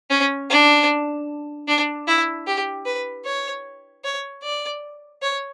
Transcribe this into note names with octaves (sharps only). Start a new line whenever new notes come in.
C#4
D4
D4
E4
G4
B4
C#5
C#5
D5
C#5